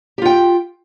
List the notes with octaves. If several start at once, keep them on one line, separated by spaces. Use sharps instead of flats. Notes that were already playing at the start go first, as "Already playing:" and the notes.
F4 G4 G5